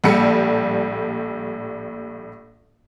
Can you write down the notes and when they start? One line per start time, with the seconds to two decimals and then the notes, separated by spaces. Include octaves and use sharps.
0.04 A#1 A2 G3 A#3 A4 C#7